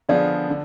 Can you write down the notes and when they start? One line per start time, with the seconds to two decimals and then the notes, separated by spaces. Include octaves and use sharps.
0.09 D3 F3 B3 F4 G#4 D5
0.49 D3